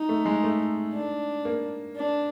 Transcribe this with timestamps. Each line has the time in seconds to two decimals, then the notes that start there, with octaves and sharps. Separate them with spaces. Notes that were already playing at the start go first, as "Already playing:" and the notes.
Already playing: D#4
0.09 A3
0.26 G#3
0.44 A3
0.94 D4
1.45 A#3
1.96 D4